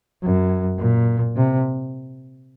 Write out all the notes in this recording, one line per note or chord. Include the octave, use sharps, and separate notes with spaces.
F#2
A#2
C3